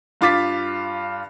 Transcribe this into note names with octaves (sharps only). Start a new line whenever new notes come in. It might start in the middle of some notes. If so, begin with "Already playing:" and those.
G2 F4 D6 A6 B6